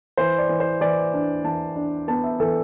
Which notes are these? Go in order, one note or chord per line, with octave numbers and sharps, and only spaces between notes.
E3 C5
D5
E3
C5
E3 D5
D4
E3 A5
D4
B3 A5
E5
E3 A4